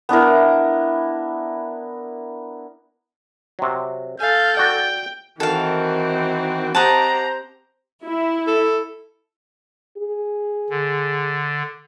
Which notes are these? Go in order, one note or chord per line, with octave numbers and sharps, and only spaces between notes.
B3 D4 E4 A#4
C3 F#3
A4 F5 G#5 G6
F#4 D5 G5
D#3 E3 C4 F#4 A4 F5 G5
C4 G4 C5 D#5 F#5 A5 A#5
E4
A4
G#4
D3